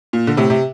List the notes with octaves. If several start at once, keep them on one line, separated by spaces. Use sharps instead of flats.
A#2
D3
A2 C3
C3